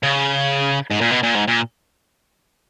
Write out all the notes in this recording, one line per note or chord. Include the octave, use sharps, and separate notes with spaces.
C#3
G#2
A#2
B2
A#2
G#2
A#2